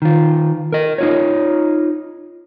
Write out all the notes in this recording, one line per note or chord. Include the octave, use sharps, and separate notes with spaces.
D#3 F4
A#4 D#5
D#4 F4 C#5